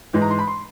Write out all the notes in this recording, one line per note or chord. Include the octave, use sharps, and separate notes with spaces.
G#2 E3 G#3
A#5
C6
B5
C6